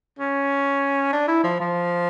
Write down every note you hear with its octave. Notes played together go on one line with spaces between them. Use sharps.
C#4
D4
E4
F3
F3